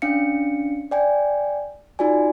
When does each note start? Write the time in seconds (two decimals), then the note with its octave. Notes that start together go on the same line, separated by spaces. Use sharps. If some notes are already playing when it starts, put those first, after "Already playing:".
0.02 C#4 D4 F5 C#7
0.91 D5 G5 G#5
1.99 D#4 F4 F#4 D5 G#5